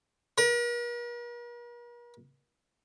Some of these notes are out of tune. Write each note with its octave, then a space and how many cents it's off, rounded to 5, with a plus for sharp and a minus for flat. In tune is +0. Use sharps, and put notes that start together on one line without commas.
A#4 +45